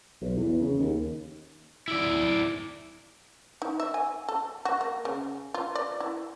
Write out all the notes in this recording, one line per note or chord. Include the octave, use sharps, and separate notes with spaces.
B1
E2
C#3
D#2
E4 D5
D#4
E5
G#5
A4
F#4
A#3
C#3
F4
D5
E4